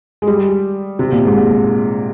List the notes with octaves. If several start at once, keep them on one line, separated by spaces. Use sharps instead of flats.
G#3
G3
C3
A#2
G#2
A#2